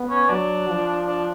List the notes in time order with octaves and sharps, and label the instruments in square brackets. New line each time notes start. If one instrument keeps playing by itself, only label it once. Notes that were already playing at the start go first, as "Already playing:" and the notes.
Already playing: [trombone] B3
[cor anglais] C#4
[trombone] F#3 [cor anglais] D4
[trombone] F3
[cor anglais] D4